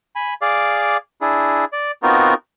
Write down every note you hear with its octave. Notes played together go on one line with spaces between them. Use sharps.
G#5 B5
G#4 D5 F5 D6
D4 E4 G#4
D5
B3 C4 D#4 F4 F#4 A#4